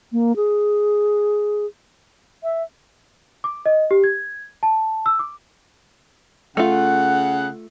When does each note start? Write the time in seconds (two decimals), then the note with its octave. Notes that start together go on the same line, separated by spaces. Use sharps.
0.12 A#3
0.36 G#4
2.44 E5
3.44 D6
3.66 D#5
3.91 G4
4.04 G#6
4.63 A5
5.06 E6
5.19 D6
6.57 C#3 A3 F4 F#5